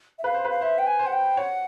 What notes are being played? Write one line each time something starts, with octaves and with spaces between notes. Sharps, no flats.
E5
B4 F5
C5
B4
F5
C5 E5
G5
G#5
C5
F#5
G5
C#5 F#5